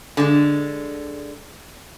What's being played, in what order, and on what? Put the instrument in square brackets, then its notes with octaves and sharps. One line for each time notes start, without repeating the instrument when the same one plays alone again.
[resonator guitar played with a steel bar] D3 G#3